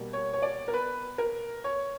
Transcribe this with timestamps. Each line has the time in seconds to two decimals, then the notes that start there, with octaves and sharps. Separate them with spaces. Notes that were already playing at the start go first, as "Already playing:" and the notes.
Already playing: B2 G3 A#3
0.13 C#5
0.33 C#5
0.42 D5
0.68 A#4
0.74 B4
1.18 A#4
1.64 C#5